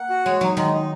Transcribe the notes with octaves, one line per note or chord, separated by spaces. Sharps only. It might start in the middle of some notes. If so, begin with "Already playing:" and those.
Already playing: A#3 F#5
F#4
G#3 C#5
F#3 D#4
D#3 G#3
D#4